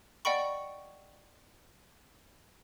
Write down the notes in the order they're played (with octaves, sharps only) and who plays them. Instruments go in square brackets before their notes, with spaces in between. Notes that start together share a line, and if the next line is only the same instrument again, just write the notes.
[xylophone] D5 D#5 F#5 G5 B5 C#6